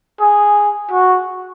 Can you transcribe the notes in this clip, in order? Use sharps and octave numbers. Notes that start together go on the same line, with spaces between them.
G#4
F#4